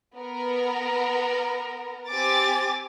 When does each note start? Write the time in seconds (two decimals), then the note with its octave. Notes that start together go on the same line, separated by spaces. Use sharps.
0.15 B3 A#4
2.09 C4 G4 G#5 D6 A6